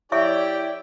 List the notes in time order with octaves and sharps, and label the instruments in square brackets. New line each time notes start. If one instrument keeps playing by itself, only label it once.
[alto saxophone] E4 [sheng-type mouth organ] G4 G5 [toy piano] C#5 E5 C#6 [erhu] D5